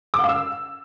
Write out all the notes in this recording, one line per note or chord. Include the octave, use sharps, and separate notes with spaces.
D6
F#5
F5
E6